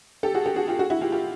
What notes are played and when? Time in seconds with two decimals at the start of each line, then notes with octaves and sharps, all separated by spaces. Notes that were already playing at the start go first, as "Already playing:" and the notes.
0.23 G4 A4
0.34 F#4 G#4
0.46 G4 A4
0.56 F#4 G#4
0.68 F4 G4
0.79 F#4 G#4
0.90 E4 F#4
1.01 F4 G4
1.12 F4 G4